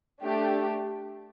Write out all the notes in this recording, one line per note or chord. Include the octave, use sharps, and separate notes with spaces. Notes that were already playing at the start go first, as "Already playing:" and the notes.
A3 D4 G4